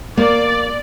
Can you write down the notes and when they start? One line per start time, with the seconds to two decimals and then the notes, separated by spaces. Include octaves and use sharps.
0.17 A#3 D5